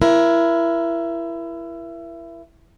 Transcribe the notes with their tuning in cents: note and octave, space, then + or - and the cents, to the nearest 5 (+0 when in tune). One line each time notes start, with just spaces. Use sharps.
E4 +25 A#4 +25